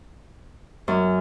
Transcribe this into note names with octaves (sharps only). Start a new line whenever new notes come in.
F#2